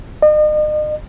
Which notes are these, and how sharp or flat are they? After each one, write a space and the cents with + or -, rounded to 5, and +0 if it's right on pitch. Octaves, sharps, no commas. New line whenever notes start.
D#5 -40